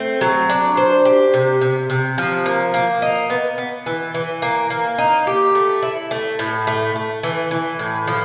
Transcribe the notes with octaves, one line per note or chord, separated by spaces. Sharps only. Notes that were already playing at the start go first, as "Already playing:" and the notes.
Already playing: A3 C4
F#3
D4
C5
G4
C3
C3
C3
F3
A#3
A#3
D#4
B3
B3
E3
E3
A#3
A#3
D#4
G4
A3
E4
A3
A2
A3
A3
E3
E3
A2
F3